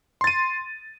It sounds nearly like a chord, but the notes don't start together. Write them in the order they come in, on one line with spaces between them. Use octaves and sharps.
C6 A6 D#7